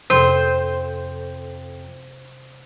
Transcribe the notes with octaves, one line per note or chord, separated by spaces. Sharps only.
F2 C3 A4 C5